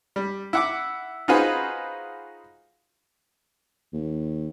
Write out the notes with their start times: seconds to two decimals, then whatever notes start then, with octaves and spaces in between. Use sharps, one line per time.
0.16 G3
0.53 E4 F#5 D6
1.28 D#4 F4 F#4 G#4 B4 C5
3.93 D#2